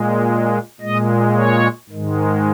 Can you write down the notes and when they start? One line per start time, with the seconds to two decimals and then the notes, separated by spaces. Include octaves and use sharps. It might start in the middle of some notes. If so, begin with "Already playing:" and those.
Already playing: A#2 G#3
0.81 A#2 G#3 D#5
1.35 C#5
1.90 G#2 D#3 G#3